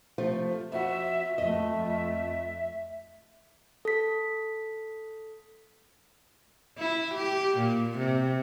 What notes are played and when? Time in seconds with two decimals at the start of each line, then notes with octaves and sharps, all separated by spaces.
0.18 C3 F3 A3
0.72 F2 F#4 E5
1.38 F2 A3 D#5 E5
3.85 A4 B6
6.78 E4
7.15 G4
7.57 A#2
7.98 C3